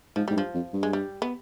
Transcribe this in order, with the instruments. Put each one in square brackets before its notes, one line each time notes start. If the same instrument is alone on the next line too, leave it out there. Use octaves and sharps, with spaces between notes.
[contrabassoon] G#2 [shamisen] F3
[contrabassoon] G#2 [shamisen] G3
[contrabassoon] G2 [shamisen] F3
[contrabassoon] F2
G2
[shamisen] G#3
G3
B3